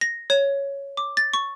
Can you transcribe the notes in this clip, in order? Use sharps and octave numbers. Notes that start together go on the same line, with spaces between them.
A#6
C#5
D6
A6
C#6